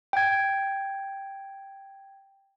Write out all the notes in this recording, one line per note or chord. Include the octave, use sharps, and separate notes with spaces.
G5 G#6